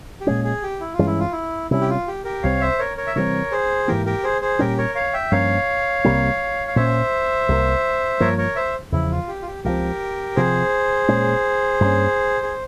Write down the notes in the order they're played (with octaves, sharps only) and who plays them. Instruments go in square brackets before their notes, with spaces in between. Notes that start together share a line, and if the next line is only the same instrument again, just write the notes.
[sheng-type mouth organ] G4
[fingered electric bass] A#2 G#3 C#4 [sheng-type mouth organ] G#4
[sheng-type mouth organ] G#4
G4
E4
F4
[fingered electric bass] G2 E3 G#3 C#4
[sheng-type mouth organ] E4
F4
E4
[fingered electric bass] C3 G3 C#4 [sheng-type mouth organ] E4
[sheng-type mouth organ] G4
F4
G4
G4 A#4
[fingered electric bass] C2 C3 G3 C4 [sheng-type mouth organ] C#5 F5
[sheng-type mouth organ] C5 E5
A#4 C#5
A#4 C#5
E5
[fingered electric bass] C3 E3 G3 C4 [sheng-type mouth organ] A#4 C#5
[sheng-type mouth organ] G#4 C5
[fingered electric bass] G#2 E3 A#3 [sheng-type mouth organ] G4 A#4
[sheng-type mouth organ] G4 A#4
G#4 C5
G#4 C5
[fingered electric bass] A#2 G3 C#4 [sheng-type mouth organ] G4 A#4
[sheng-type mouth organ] A#4 C#5
C#5 F5
E5 G5
[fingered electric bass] G2 F3 A#3 C#4 [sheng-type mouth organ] C#5 F5
[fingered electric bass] C2 C3 G3 A#3
[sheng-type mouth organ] F5
[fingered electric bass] A#2 G#3 C#4 [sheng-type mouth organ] C5 E5
[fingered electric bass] C2 C3 G3 A#3
[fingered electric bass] G2 F3 A#3 [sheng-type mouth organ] A#4 C#5
[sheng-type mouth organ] A#4 C#5
C5 E5
[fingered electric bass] E2 C#3 F3 [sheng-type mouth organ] E4
[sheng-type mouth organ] F4
G4
F4
G4
[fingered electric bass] C#2 C3 F3 C4 [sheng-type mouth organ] G4 A#4
[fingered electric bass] C3 F3 C4 [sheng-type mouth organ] G#4 C5
[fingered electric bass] A#2 G#3 C#4
G2 F3 A#3 C#4
[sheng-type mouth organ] G#4